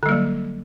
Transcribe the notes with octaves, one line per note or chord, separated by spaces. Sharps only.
D3 F#3 G3 A#3